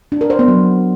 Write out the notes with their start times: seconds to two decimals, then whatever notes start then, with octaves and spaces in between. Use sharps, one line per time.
0.12 D4
0.21 A#4
0.30 C5
0.39 B3
0.48 F#3